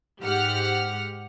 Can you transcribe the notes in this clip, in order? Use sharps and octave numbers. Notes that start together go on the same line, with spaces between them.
G#2 G4 F#5 F6